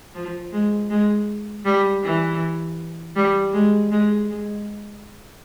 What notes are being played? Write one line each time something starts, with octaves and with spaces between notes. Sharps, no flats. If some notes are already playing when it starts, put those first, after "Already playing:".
F3
G#3
G#3
G3
E3
G3
G#3
G#3
G#3